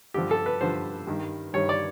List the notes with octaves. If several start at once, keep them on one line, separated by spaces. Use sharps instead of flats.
G2 D3 F3 G4
A4
B4
G2 D3 F3 C5
G2 D#3 G3
G2 D#3 G3 C#5
D5